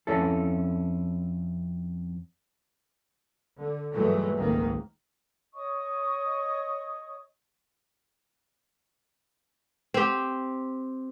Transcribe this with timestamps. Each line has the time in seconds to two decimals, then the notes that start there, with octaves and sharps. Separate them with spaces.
0.07 F2 C#4 E4 A4
3.57 D3
3.93 G2 A#2 E3 F#3 G#3 A3
4.36 G#1 C#2 G#2 D#3 A#3
5.54 C#5 D#5 C#6 D#6
9.94 C4 G4